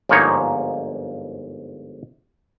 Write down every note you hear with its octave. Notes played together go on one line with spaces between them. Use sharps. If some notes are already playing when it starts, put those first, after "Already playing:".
G1 G#2 F3 A#3 D#4 C#5